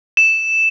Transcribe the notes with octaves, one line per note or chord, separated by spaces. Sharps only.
E7